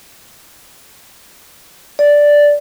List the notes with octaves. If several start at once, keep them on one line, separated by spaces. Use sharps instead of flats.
D5